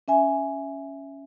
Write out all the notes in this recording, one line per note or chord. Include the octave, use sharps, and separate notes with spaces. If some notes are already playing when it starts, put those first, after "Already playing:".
C#4 E5 G#5